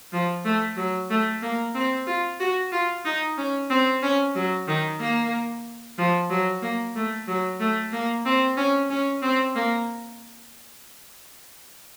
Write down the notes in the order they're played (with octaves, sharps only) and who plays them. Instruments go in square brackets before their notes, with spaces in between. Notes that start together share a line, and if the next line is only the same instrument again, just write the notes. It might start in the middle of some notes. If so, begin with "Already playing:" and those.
[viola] F3
A3
F#3
A3
A#3
C4
F4
F#4
F4
D#4
C#4
C4
C#4
F#3
D#3
A#3
F3
F#3
A#3
A3
F#3
A3
A#3
C4
C#4
C#4
C4
A#3